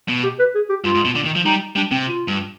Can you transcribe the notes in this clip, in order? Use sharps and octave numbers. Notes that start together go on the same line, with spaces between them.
B2
G4
B4
G#4
G4
G2 F4
G#2
B2
D3
D#3
F3
G3 D#4
G3 D4
C3 C4
F4
G2